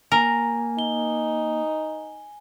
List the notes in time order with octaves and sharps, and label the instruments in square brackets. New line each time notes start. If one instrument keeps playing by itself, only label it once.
[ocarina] A#3 [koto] A#4 [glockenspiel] G#5
[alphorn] D#4 [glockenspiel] G7